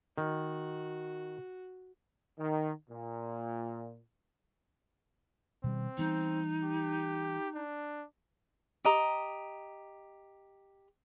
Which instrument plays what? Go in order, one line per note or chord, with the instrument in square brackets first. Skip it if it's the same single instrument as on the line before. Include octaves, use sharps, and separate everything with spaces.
[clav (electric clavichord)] D#3 [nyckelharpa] F#4
[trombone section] D#3
A#2
[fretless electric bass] B2 D#3 G3 [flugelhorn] C4
[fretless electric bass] E3 G3 B3 [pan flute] D#4
[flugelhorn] G4
D4
[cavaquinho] G4 D#5 A#5